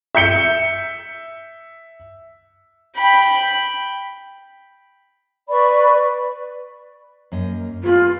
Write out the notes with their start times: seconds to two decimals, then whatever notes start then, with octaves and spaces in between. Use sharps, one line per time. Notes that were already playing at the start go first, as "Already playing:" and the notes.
0.15 E5 G6 C#7 G7
2.96 G5 B5
5.50 B4 D5 B5 C#6
7.32 F#2 A#3 D#5
7.83 B3 F4 G#4 B4